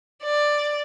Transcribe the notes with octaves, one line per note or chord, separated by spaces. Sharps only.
D5